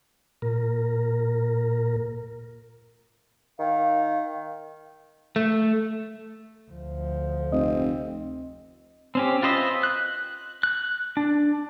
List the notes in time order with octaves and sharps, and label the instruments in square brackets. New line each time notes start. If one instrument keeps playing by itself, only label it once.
[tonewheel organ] A#2 A#4
[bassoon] D#3 [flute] F5
[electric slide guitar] A3
[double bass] D2 F3
[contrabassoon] F1 [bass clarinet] C4 [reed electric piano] D#5
[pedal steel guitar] C4 C#4 G4
F4 B4 C5 D#5 E5
F#6
F#6
D4